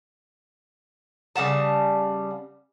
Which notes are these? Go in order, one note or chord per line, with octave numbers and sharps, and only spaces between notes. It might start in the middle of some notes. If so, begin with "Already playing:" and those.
C#3 G3 F#5 A5